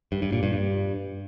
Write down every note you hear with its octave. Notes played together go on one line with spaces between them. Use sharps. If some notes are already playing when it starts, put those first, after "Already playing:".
G2
G2
A#2
G2
G2